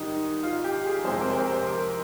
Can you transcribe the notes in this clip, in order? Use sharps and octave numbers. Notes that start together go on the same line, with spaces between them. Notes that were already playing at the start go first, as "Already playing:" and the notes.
Already playing: G#2 D#3 G3 D#4
F4
G4
G#4
F2 C3 F3 G#3 C5
A#4
C5
A#4
C5
A#4